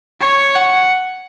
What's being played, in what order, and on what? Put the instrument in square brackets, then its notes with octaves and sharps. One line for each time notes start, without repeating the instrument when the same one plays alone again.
[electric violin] C#5
F#5